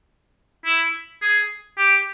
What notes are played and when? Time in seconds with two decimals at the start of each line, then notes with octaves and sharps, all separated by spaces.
0.65 E4
1.22 G#4
1.78 G4